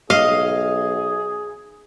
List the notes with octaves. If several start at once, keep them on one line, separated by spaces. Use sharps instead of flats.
B1 G#4 D#5 F5